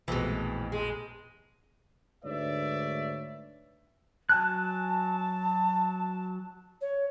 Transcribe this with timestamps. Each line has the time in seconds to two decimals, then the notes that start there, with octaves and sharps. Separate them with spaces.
0.08 A#1 F2 B2 E3 G#3 A3
0.72 G#3
2.24 D2 G#2 B4 C#5 D5 E5
4.29 F#3 G#5 A5 F#6
6.81 C#5